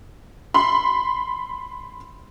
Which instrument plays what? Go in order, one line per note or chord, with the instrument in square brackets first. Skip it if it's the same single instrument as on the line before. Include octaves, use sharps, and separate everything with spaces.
[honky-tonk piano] B5 C6